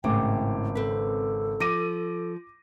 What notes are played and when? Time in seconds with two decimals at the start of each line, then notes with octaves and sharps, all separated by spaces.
0.04 G#1 A2 C#3 G5 D6
0.75 C4 A4 B4
1.60 F3 D6 A#6 D#7